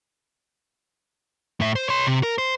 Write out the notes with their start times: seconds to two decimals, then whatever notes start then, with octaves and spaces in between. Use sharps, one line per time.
1.60 A2 E5
1.76 C5
1.89 C#5 C6
2.07 C3
2.23 A#4
2.38 C5